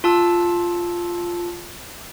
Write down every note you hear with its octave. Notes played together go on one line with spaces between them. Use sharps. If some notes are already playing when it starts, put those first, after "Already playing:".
F4 A5 E6